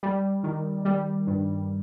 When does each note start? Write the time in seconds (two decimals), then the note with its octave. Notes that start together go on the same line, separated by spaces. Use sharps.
0.03 G3
0.44 D#3
0.85 G3
1.27 G2